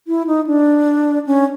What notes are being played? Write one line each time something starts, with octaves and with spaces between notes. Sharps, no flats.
E4
D#4
D4
C#4